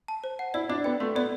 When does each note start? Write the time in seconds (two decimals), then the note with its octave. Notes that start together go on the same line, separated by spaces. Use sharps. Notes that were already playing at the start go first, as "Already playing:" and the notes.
0.08 A5
0.24 C5
0.39 F#5
0.54 E4 D5
0.69 D4 D5
0.84 B3 G5
1.00 A3 C6
1.15 B3 D5